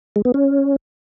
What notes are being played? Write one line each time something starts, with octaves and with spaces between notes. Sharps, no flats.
G#3
B3
C#4